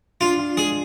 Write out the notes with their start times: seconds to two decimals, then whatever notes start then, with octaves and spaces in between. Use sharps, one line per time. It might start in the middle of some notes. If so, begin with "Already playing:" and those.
0.21 D4 F4
0.39 F4
0.57 G#3 G#4